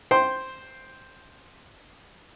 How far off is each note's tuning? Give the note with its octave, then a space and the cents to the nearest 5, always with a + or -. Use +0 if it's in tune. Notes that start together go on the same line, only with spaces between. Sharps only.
C5 +0 G5 -5 C6 +0